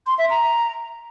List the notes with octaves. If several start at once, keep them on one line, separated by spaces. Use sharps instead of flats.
C6
E5
A#5